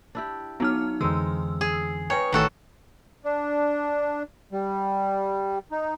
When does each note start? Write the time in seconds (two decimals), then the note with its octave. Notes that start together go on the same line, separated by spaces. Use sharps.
0.15 D4 E4 G4
0.60 F#3 B3 D#4 F6
1.01 F2 D3 E3 G#3 C4 D#4 E6
1.61 G#4
2.10 D#4 B4 C#5 G5 G#5
2.32 A1 A2 D#3 E3 F#4 A4 C#6
3.24 D4
4.52 G3
5.72 D#4